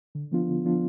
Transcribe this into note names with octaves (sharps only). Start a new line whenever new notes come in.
D3
F3 B3 D4 F4
D3
F3 B3 D4 F4